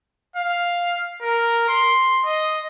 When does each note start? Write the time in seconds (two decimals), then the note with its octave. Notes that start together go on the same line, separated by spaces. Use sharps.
0.36 F5
1.22 A#4
1.69 C6
2.26 D#5